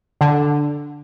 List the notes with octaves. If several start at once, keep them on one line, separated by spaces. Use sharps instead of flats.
D3